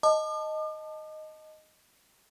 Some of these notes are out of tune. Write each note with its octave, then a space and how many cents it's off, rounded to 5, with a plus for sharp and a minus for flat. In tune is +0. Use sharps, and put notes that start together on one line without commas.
D#5 +0 A5 +0 D6 +45